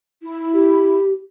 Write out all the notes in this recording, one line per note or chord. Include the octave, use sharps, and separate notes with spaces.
E4
G4